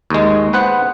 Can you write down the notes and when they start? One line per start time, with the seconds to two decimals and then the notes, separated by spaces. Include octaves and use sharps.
0.10 D#2 G#3
0.53 B3 B4 C5 F#5